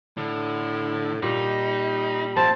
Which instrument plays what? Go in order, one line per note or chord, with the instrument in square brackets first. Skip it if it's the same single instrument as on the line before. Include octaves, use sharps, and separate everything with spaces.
[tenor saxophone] A2 [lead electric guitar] D3
[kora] A#2 [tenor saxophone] G3 [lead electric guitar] D#4
[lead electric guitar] F3 A#3 [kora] C4 [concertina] A5